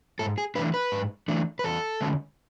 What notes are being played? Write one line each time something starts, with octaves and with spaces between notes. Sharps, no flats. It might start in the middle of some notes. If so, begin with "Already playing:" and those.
G#2 A4
G#4
E3 A3 D4 B4
B4
G#2
E3 A3 D4
B4
E2 A4
D3 G#3 C#4